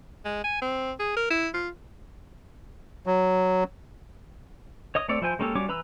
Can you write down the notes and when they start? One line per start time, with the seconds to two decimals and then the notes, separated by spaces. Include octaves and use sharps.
0.25 G#3
0.44 G#5
0.62 C4
0.99 G#4
1.16 A#4
1.30 E4
1.54 F4
3.06 F#3
4.95 C#5 D#5 D#6
5.08 A3 C4 A4 C#5 D5
5.21 F3 E4 C5 G#5 G6
5.39 G#3 A#3 C#4 G4 A4
5.55 G3 C#4 F#4 C#5 D6
5.68 E3 B4 A#5 B5 E6